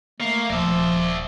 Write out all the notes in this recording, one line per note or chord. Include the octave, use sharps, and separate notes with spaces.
A3 A#3 F5
D#1 F3 D5 E5